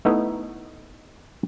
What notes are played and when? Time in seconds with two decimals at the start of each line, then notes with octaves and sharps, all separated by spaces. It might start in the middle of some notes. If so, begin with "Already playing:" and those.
0.05 A3 B3 D#4 E4 E5